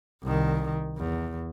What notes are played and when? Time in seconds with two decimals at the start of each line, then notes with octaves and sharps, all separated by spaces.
0.23 C2 D#3
0.98 E2